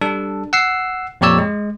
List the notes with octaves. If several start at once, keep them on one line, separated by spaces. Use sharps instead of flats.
G3 D4 A4
F#5 E6 C7
F2 A#2 G4 C#5 D5 E6
G#3